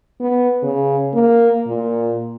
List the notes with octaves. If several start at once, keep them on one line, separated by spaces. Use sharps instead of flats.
B3
C#3
A#3
A#2